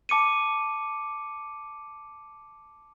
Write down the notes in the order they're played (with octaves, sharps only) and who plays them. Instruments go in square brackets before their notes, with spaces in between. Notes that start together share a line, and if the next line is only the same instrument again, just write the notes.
[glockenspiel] A5 D6 C#7 D#7